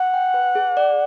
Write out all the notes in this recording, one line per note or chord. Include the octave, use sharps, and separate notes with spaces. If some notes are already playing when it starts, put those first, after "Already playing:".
Already playing: F#5
G5
B4
G#4
D5